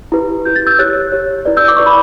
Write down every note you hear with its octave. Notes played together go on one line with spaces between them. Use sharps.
E4 G4 B4
E4 G4 B4 G6
A6
E6 G6
G4 C#5 F#6 A6
G4 C#5
E4 B4 D5
E6 G6
D6
E4 B4 D5 C#6
B5